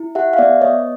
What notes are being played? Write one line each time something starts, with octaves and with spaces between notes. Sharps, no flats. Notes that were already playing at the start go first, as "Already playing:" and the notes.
Already playing: E4
G4 E5 F#5
F5
B3 D5 E5
B3 C#5 D#5